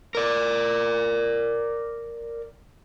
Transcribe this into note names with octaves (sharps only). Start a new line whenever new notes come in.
A#4 D5